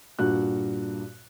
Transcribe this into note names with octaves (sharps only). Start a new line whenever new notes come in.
G2 A#2 F#4 F#6